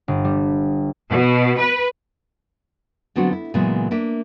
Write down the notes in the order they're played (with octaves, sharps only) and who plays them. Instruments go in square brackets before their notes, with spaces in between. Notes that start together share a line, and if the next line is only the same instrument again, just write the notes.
[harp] G1
G3
[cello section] B2
B4
[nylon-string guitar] D3 F#3 B3 C4 D4 F#4
E4
A#2 C#3 E3 F#3 G#3 B3
A#3 D4 E5